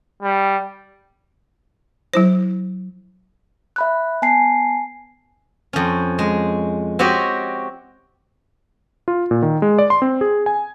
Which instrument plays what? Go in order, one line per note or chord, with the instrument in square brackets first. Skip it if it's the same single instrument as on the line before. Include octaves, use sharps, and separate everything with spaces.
[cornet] G3
[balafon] F#3 E4 C5
[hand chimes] E5 B5 F#6
B3 G#5 A5 C7
[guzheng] F2 C#4
G#3
C4 F#4 G4 C#5 D#5
[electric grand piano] F4
A#2
D#3
G#3
D5
C6
C4
G#4
G#5